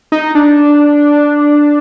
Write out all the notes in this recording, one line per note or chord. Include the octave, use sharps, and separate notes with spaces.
D#4
D4